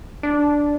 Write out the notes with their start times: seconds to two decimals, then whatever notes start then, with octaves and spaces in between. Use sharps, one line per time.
0.23 D4